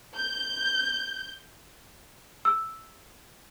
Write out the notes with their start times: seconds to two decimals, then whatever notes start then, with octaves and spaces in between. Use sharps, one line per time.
0.14 G6
2.45 E6